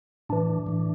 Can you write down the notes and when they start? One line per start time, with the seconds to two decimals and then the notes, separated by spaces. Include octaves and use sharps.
0.29 A2 E3 D4
0.66 A2 E3